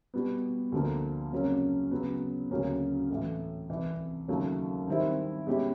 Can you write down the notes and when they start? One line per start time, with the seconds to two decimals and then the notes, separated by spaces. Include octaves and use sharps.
0.14 B2 G3 B3
0.72 D2 D3 F3 A#3
1.32 F2 C#3 F#3 A#3 C#4
1.91 C#3 F#3 B3
2.51 D2 C#3 F#3 A#3 C#4
3.10 A2 E3 A3
3.69 C2 C3 E3
4.28 D#2 C#3 F#3 A3
4.88 D#3 G3 C4 E4
5.47 B2 G#3 C#4 E4 G4